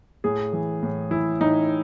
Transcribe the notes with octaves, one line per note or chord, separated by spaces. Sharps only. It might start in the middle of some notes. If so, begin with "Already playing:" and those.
A2 G#4
E3
A2
E3 E4
A2 D#4